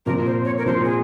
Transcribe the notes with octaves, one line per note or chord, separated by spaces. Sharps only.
A#2 F3 C4 A#4
C5
C#5
A#4
A#2 F3 C4 C5
G#4